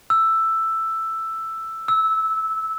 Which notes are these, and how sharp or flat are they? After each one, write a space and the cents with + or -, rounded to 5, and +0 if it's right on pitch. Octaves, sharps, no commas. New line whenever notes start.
E6 +5
E6 -15